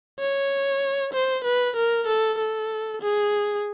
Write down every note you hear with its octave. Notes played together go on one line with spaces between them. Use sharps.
C#5
C5
B4
A#4
A4
A4
G#4